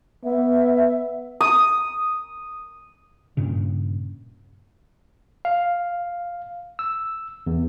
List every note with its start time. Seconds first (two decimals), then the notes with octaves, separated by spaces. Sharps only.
0.25 B3 E5
1.41 D#6
3.37 G2 A#2 C#3
5.45 F5
6.79 E6
7.47 E2